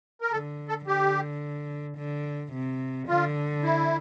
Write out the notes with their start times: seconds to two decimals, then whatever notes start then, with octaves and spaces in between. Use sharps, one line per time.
0.21 A#4
0.32 D3 A4
0.69 A4
0.87 D3 G4
1.98 D3
2.52 C3
3.08 D3 F4
3.64 E4